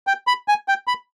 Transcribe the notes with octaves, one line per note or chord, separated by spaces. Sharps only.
G5
B5
G#5
G5
B5